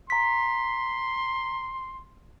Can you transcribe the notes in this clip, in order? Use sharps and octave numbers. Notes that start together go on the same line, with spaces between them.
A#5 C6 B6